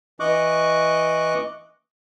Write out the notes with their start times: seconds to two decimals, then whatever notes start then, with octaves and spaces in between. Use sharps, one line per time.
0.20 E3 D#5 C#6 D6 F#6